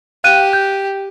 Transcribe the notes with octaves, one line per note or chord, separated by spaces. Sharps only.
G4 F5 F#6 D#7
G6